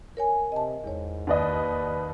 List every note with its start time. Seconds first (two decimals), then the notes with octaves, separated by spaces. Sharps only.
0.17 A#4 C#5 G#5
0.52 C3 D#5 A5
0.84 E2 G#2 C#5
1.27 D#2 B4 D5 D#5